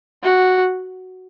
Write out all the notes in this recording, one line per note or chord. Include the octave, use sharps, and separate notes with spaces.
F#4